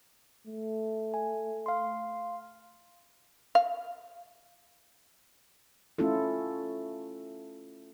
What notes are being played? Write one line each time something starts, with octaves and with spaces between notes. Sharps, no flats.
A3
G#5
F5 C6
F5
A3 C#4 E4 F4 A4